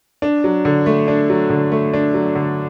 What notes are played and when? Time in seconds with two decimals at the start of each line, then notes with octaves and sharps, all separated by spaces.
0.22 D4
0.44 F#3
0.65 D3
0.86 A3
1.08 D4
1.30 F#3
1.50 D3
1.72 A3
1.94 D4
2.14 F#3
2.35 D3